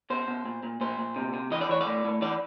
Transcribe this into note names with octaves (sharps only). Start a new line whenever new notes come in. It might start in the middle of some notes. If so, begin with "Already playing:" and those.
B2 C5
B2
A#2
A#2
A#2 C5
A#2
C3
C3
E3 D#5
D5
E3 C#5
D5
A2
A2
E3 D5